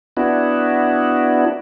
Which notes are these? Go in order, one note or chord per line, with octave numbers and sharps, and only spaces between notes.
B3 D4 E4 F#4